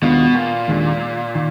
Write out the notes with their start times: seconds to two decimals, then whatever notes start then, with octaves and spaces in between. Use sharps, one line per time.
0.02 D#2 B2 D#3 G#3 D4 F4
0.35 A#2
0.68 D#2 D#3 G#3 D4 F4
1.35 D#3